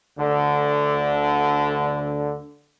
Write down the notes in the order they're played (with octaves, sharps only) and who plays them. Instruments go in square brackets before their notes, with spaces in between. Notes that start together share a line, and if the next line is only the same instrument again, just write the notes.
[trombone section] D2 D3